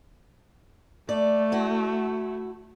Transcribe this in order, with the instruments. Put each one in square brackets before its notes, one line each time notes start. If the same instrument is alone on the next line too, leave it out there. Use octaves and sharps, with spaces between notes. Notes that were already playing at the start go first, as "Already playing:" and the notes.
[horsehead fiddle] A3 [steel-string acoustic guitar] D5
[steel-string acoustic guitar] E4 F#4